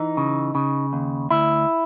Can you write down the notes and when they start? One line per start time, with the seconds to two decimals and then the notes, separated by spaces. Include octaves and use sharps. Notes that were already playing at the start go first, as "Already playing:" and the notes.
Already playing: E3 D#4
0.17 C#3
0.55 C#3
0.93 D#2
1.31 D2 E4